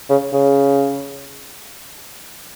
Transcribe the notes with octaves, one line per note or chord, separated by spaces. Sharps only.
C#3
C#3